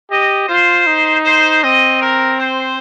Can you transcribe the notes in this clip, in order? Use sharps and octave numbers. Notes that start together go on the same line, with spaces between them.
G4 D#5
F4 C5
D#4
C5
C4 D#5
A#4
C5